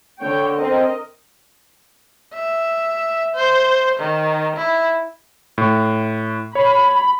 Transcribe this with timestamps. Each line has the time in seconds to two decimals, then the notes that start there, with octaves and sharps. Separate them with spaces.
0.20 D3 C#5 G5
0.58 C4 A#4 D#5
2.33 E5
3.35 C5
4.00 D#3
4.56 E4
5.58 A2
6.55 C#5 B5